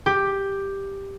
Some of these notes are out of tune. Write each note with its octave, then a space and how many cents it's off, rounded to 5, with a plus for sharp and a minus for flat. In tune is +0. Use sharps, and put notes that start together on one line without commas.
G4 +5